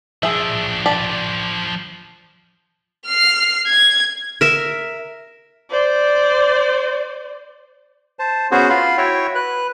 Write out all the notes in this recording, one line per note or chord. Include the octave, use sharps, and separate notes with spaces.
F3 D4 G#4 E5
G4 D5 A5
F6 C7
G#6
A#4 E5
C5 D5
C5 A5
B3 C#4 F#4 G#4 C5
F4 F5 B5 C6
E4 F#4 C#5 E5 G5
B4 F#6